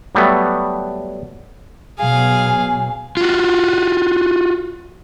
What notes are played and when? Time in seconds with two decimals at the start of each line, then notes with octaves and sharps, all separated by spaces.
0.15 F#3 G3 A3 B3
1.98 B2 F#3 G#4 F5 G#5
3.17 F4 F#4